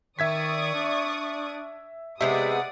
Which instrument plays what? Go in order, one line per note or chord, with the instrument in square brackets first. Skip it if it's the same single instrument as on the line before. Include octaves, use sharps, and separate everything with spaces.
[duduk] D#3 [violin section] D5 C#6 D#6 [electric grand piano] E5 G#6 B6
[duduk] D4
[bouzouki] C3 G#3 B3 [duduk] G4 [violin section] D5 F#5 D#6 [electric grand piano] E5